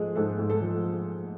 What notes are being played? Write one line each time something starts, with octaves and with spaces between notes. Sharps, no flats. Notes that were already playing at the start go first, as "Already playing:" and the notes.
Already playing: G#2 F3 G#3 G#4 A4
G#2 A4
G#2
A4
F3